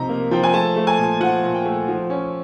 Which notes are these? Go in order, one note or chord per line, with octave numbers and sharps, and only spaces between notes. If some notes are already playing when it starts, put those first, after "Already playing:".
Already playing: C3 F3 D#4 A#5
A#3
F3 G5
G#5
A3 A5
A3
G#5
A#2
F3 F#5
A#2
G5
A3
F3
C#4